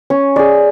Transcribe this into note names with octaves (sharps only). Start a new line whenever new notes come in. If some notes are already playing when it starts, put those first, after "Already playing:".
C#4
G#4 D5